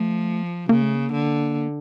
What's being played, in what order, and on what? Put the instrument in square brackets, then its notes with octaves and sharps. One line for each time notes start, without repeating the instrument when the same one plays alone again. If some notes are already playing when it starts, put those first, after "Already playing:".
Already playing: [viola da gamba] F3 [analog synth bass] A3
[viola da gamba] C#3 [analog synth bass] A#3
[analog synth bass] A3
A#3
[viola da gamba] D3